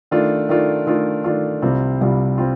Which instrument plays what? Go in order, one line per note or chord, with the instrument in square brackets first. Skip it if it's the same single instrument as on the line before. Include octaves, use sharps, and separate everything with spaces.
[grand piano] D#3 A3 D4 F4
D#3 A3 D4 F4
D#3 A3 D4 F4
D#3 A3 D4 F4
C2 C3 G3 C4 F4
C2 C3 G3 C4 F4
G3 C4 F4